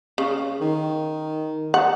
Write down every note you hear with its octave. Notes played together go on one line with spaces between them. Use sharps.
C#3
D#3
F#5